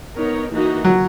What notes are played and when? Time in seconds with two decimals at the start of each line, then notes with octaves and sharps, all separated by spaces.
0.16 B3 D#4 A#4 C#5
0.51 E3 A#3 D#4 F#4
0.85 F#3